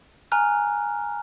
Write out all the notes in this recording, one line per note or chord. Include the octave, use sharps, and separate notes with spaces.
G#5 A#5 F6 F#6